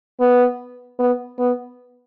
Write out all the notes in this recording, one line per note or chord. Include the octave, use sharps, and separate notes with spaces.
B3
B3
B3